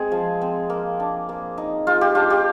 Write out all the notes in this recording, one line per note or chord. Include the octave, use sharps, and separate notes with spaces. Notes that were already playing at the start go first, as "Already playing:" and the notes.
Already playing: G#3 C4 G#4
F3
C4
A#3
D4
A#3
D#4
G#3 F4
G4
D4 F4
G4